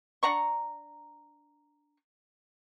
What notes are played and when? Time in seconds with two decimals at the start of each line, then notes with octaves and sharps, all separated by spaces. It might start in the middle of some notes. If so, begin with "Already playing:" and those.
0.23 D4 F#5 A#5 C#6